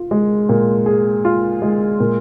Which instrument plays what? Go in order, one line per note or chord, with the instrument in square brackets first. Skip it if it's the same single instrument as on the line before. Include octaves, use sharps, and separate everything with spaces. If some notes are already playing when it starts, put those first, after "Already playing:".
Already playing: [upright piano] F4
G#3
A#2
G#4
F4
G#3
A#2